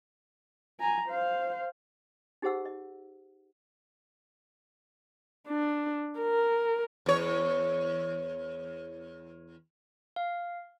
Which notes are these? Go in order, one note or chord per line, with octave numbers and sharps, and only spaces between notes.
G#5 A#5
C5 F5
D#4 G4 G#4 C5 F#5 E6
D#5
D4
A#4
E2 C#5
F5